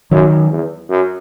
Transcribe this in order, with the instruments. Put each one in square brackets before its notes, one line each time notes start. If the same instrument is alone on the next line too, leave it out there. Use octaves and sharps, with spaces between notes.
[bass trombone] F#2 [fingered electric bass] D#3 F#3
[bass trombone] E2
F#2